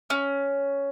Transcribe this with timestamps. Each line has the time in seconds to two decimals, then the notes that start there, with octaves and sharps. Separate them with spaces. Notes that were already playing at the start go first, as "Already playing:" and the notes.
0.10 C#4